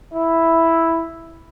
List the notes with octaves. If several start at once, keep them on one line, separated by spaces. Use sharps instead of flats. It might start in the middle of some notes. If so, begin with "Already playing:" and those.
E4